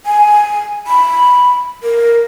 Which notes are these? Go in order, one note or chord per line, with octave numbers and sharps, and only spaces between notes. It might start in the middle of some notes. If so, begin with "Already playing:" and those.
G#5
B5
A#4